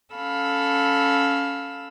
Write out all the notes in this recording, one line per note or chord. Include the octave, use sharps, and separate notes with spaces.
C#4 A4 F5 B5 E6